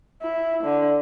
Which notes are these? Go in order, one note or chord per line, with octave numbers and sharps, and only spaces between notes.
E4
D3